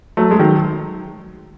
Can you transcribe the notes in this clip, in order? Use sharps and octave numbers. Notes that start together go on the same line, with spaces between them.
F#3 A3
G#3
D#3 F#3